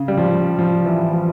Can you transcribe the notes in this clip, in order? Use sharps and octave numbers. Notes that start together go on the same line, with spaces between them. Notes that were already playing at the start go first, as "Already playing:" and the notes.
Already playing: C#3
G3
F3
F3
E3
F3